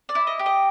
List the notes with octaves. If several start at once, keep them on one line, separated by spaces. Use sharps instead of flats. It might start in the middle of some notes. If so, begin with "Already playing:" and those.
D5
E4
D#5
G4
D#5